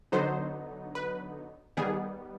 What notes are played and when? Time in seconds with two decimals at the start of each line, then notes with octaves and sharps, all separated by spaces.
0.12 D3 F#3 B3 D#4 C5
0.95 B4
1.77 D#3 G3 B3 G#4